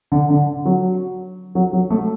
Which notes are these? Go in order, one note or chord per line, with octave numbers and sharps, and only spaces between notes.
D3
D3
F#3
F#3
F#3
A3